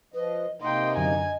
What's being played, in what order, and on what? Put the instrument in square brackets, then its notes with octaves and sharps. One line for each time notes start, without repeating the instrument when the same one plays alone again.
[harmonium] F3 D#5 [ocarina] B4
[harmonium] C3 A#3 D#4 [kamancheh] D#5 G5 [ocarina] C6
[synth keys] F#2 D3 [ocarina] D#5 [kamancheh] G#5